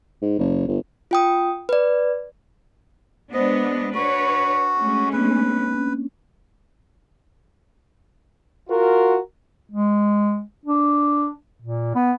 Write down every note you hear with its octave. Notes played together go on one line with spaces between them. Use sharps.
G#2
F#1
G1
F4 G5 D#6
B4 D5
G#3 B3 D4 C5 D5 D#5
D4 F#4 B4 C#5
G#3 A3 C#4
A#3 C4 D4 B4
C#4
F4 F#4 A#4
G#3
D4
A#2
B3